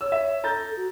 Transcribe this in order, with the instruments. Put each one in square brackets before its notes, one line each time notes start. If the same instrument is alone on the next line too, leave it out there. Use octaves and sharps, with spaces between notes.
[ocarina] C#5 [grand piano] E6
[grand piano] E5
[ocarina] A4 [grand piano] A#5 G6 A6
[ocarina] F#4